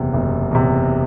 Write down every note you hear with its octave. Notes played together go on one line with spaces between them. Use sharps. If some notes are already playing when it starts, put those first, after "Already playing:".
Already playing: F#1 E2 C3
F#1
E2 C3